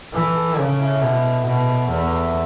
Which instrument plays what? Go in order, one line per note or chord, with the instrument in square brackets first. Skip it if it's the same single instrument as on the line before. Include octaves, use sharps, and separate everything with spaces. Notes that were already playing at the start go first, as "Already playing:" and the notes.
[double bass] E3 [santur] A4
[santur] A4
[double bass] C#3 [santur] C#4
[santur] E4
[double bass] B2 [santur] B3
[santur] B3
[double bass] B2 [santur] B4
[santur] B3
[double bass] E2 [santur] A4
[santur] A3